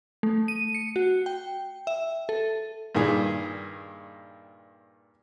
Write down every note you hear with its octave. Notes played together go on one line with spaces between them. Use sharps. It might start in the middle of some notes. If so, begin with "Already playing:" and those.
A3
D#7
C#7
F#4
G5
E5
A4
G2 A#2 D#3 G#4